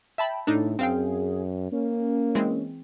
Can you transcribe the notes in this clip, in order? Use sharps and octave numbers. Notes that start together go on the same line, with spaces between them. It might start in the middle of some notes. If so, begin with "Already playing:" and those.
E5 G5 A5 B5
A2 D4 D#4 A4
F#2 C4 G#4 F5 G5
A#3 C#4
E3 G#3 C4